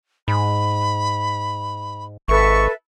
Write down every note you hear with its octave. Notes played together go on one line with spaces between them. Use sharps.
G#2 B5
G#1 A4 B4 E5 C#6